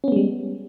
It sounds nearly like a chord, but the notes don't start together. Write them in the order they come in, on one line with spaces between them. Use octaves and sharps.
C#4 B3 G#3 G3